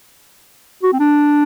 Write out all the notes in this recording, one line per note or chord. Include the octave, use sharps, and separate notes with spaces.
F#4
C4
D4